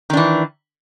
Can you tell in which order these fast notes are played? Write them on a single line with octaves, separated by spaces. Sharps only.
D#3 D4 E3